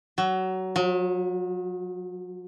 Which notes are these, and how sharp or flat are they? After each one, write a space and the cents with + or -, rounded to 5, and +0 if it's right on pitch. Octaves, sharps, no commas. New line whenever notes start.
F#3 +20
F#3 -40